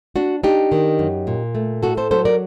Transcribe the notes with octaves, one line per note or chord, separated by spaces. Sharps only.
D4 F#4
D4 D#4 G4
D#3
F#2
A#2
A3
A2 F#4 A4
A4 C5
F#3 A4 C5
A#4 D5